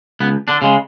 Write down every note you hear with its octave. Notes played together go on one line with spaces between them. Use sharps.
C#2 B3
D3 D4
C#3 G#3